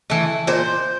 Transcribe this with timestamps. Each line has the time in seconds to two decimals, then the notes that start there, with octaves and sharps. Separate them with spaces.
0.10 E3 A3
0.47 A#2 C5